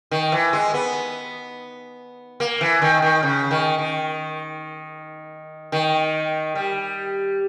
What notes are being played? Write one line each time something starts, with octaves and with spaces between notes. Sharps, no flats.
D#3
E3
G#3
B3
A#3
E3
D#3
D#3
C#3
D#3
D#3
D#3
G3